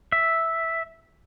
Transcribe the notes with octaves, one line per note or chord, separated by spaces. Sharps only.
E5